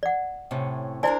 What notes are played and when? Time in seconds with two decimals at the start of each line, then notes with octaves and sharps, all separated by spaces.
0.03 D5 F#5
0.51 A2 C3 C#4
1.03 D4 E4 A#4 C5 D5 G#5